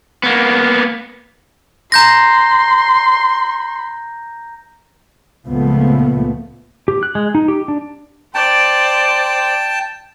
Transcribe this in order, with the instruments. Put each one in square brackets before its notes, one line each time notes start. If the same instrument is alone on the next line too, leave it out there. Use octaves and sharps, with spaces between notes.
[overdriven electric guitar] A#3 B3
[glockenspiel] A#5 G6 A#6 [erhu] C6
[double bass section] C#2 A#2 F3 A3 B3
[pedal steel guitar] G4
F#6
G#3
D#4
G4
D4
[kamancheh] C5 D5 [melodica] G5 A5